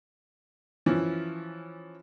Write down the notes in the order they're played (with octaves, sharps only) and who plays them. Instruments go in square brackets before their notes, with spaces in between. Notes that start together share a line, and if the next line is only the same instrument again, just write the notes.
[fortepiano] E3 F3 C#4